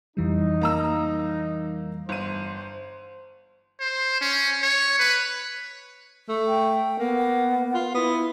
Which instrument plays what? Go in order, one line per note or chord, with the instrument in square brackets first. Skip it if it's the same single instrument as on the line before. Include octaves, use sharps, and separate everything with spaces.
[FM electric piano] F2 E3 G3 [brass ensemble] D#4
[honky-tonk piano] A#3 A#5 E6
[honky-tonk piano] G1 D#7 [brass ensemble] C5
[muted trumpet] C5
C#4
C#5
B4
[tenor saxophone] A3
[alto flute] G5
[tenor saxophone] A#3 [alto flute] B3
[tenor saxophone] F4
[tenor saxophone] B3 [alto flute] E4